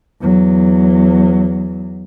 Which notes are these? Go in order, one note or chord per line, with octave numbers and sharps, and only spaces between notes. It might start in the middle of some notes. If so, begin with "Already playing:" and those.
E2 F#3